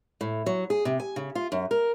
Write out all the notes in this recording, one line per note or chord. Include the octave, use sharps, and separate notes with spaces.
A2
F#3
G#4
C3
G#5
C#3
F4
F#2
A#4